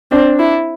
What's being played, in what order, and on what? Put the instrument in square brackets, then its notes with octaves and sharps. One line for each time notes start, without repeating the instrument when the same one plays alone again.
[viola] C4 [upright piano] D4
[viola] E4